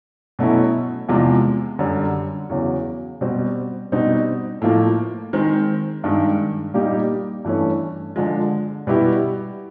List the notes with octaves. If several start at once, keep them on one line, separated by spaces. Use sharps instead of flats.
B2 F#3 A3 C#4 E4
E2 C3 F3 G#3
F#2 D3 G3
E2 C#3 F#3
B2 G3 C4
B2 G3 C4 D#4
A2 F3 A#3
D#3 G#3 C4
G2 D#3 G#3
A#2 G3 A#3 D#4 G4
G2 E3 A3 C#4
D3 F3 G#3
B2 G3 B3 E4 G4